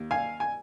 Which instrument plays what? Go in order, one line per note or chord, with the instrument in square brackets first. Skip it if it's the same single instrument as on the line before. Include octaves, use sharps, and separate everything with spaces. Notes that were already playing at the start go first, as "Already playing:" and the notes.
Already playing: [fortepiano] D#2
F5 G#5
G#5